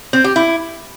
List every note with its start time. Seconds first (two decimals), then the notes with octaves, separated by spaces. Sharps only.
0.13 C4
0.24 G4
0.36 E4